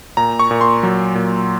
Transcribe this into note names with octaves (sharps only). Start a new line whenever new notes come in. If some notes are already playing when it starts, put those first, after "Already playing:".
A#2 A#5
C#6
A#2
C6
F#3
A#2